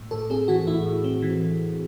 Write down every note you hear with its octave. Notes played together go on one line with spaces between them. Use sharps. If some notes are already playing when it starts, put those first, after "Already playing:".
Already playing: A2
A2 A4
C4 G#4
E3 F#4
A2 E4
A2
C4
E3